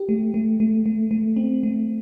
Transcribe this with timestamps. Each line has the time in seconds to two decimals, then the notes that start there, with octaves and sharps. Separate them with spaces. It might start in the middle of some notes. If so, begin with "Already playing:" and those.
Already playing: G4
0.09 A3
0.34 A3
0.60 A3
0.86 A3
1.11 A3
1.36 C4
1.63 A3